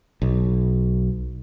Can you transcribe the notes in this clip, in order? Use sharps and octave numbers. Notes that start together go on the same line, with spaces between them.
B1